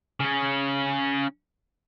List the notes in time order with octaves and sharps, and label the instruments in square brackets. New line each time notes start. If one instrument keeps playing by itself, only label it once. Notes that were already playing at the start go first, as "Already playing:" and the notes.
[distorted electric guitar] C#3 C#4